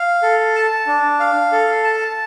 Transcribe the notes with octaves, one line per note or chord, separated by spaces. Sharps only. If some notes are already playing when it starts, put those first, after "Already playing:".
Already playing: F5
A4
A5
D4
F5
A4
A5